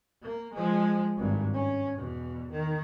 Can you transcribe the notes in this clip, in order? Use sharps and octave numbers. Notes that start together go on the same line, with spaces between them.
A#3
F3 G#3
G#1 G2
C#4
E2 B2
D#3